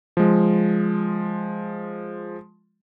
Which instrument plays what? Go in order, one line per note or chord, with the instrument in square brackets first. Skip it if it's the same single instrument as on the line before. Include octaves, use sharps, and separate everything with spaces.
[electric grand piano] F3 G#3